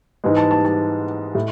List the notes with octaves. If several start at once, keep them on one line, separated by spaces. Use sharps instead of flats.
G#2 E3 G#3
A5
A5
A5
A2